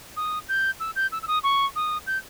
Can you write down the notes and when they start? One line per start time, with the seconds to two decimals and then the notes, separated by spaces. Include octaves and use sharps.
0.17 D#6
0.49 G6
0.80 E6
0.96 G6
1.12 E6
1.23 E6
1.28 D#6
1.43 C#6
1.76 D#6
2.07 G6